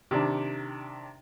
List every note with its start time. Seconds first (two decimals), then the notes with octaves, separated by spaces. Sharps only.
0.11 C3 D#3 D4